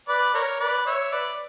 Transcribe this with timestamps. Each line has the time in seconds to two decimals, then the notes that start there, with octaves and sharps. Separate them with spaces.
0.08 B4 D5
0.34 A#4 C#5
0.60 B4 D5
0.86 C#5 E5
1.12 B4 D5